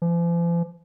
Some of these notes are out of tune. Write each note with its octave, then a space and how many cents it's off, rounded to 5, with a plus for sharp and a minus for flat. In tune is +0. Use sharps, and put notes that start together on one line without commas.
F3 -45